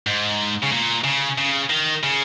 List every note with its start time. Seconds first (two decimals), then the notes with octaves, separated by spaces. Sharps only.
0.07 G#2
0.63 C#3
0.72 A#2
1.04 C#3
1.38 C#3
1.70 D#3
2.03 C#3